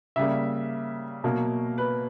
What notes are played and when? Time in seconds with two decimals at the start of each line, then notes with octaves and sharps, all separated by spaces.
0.16 C#3 G3 A#3 E5
1.24 B2 F#3 A#3
1.78 B4